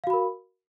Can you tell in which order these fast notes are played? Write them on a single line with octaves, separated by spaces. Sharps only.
F5 F#4 B5 A#4